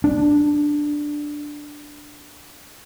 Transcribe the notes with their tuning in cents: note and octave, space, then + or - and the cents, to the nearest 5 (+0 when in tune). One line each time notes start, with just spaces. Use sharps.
D4 +5